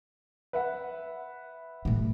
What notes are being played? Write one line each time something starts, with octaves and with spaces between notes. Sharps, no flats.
B4 E5 F#5
A2 G3